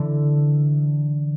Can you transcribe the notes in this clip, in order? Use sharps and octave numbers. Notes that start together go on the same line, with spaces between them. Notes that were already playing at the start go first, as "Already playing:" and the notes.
Already playing: D3 E3